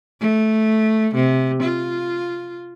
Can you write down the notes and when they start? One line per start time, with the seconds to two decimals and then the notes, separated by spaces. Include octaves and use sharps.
0.21 A3
1.14 C3
1.62 F4